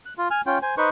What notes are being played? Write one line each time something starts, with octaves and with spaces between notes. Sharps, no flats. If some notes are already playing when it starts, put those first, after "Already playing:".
F#6
F4
G#5 F6
C#4 F4 G5
C5 G#5
D#4 B4 C5 C#6